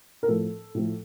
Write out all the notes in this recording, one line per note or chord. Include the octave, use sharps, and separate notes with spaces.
A#4
A2 F3 A3 A4
A2 F3 A3